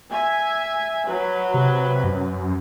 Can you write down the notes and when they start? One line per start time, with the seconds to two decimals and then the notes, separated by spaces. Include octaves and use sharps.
0.10 E5 G#5
1.07 F#3 B4
1.54 C3
2.04 F#2